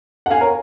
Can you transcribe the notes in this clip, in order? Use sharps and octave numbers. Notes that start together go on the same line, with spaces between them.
F#5
F5 G#5
A#4 C#5